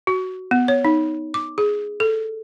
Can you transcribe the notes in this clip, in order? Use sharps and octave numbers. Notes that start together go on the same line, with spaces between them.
F#4
B3
C#5
D#4
D6
G#4
A4